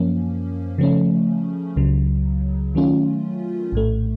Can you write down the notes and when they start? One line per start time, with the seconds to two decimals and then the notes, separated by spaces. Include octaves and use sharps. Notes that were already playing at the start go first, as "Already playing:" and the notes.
Already playing: F#2 F3 A#3 C#4
0.78 C#3 F3 A3 C#4
1.76 C#2 C#3 F#3
2.75 D#3 F#3 A3 C#4 F4
3.72 A#1 A2 A3